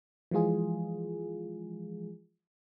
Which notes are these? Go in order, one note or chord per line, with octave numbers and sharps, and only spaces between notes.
E3 F3 G#3 F4 G#4